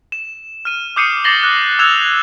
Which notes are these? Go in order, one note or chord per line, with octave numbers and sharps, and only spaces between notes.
E7
F6 D#7
D6 D#6 G6 C7 C#7 D#7
D6 A6 A#6 C7 F#7 G7
F#6
E6 F#6 G#6 E7 F7